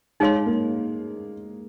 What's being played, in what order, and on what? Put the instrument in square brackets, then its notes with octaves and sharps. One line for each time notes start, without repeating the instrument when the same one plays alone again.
[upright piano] G#3 [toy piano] D#4 G#4 C#5 F5 C6
[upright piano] A#3